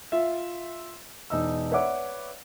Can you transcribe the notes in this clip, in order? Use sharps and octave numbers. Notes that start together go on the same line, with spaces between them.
F4 E5
E1 D#4 E6
B4 C#5 D5 E5 F#5 D6